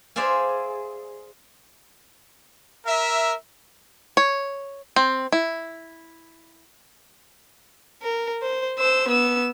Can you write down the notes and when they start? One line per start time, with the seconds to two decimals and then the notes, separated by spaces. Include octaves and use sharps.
0.16 G#4 C5 D5 E5 F5 G#5
2.86 A#4 E5
4.17 C#5
4.96 C4
5.32 E4
8.02 A#4
8.42 C5
8.79 C5 E6
9.08 B3 E6